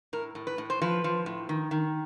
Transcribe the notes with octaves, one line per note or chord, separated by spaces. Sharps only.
A2 A#4
A2
B4
A2
C5
F3 B4
F3
A2
D#3
D#3